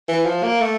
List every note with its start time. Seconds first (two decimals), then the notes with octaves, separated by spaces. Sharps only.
0.08 E3
0.26 F3
0.43 A#3
0.61 A3